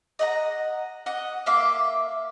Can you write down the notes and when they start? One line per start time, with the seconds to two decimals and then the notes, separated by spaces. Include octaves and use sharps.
0.19 D#5 F#5 A#5
1.06 D#5 F#5
1.46 A#3 E5 F5 D6